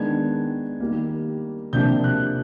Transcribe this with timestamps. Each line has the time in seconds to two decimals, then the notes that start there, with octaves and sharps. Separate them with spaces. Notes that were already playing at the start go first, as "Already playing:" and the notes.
Already playing: D#3 G#3 B3 D4 G#6
0.80 D#3 G3 A#3
1.73 C3 F3 A#3 D4 G6
2.04 F#6